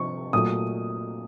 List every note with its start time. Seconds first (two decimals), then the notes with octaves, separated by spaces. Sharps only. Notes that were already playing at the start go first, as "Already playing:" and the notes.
Already playing: C3 F3 C4 C#6
0.33 A#2 F#3 A3 D#6